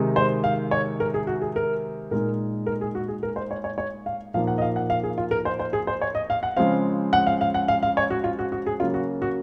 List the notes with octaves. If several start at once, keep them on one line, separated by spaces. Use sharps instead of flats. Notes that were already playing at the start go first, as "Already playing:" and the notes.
Already playing: C3 D#3 G#3 D#4
C5
F5
C#5
A#4
G#4
F#4
G#4
A#4
A#2 G#3 D#4 A#4
A#4
G#4
F#4
G#4
A#4
C5
C#5
C#5
C#5
F5
A#2 F3 A#3 D#4 F5
F#5
D#5
F5
F#5
F5
G#4
F4
A#4
C5
C5
G#4
C5
C#5
D#5
F5
F#5
C#3 F3 G#3 C4 F5
F#5
F5
F5
F#5
F5
F5
C#5
F#4
F4
F#4
F#4
G#4
C#3 F#3 A#3 F4
F#4
F#4